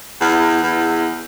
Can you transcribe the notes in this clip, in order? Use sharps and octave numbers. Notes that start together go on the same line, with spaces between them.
E2
E2